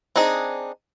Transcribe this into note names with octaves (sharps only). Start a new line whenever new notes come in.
C4 D4 D#4 G#4